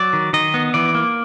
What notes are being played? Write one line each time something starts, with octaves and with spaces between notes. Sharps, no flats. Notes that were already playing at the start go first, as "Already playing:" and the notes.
Already playing: F#3 D5
D#3
D#3 D#5
B3
E3 D5
A#3